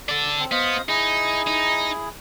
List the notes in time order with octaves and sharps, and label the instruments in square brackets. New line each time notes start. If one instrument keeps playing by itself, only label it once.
[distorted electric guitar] D4 A4
[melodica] C4
[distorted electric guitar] B3 [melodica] C5 D#5 F5
[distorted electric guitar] D#4 [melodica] E4 G#4
[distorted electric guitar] D#4